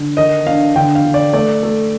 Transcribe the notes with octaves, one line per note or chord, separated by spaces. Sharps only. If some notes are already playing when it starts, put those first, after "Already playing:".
Already playing: D3
D#3 D#5
D4 F5
D3 G5
F5
D3
D5
A3 D5
A3